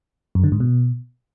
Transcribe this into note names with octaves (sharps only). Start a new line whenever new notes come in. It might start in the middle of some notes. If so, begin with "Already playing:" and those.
F#2
D3
G#2
B2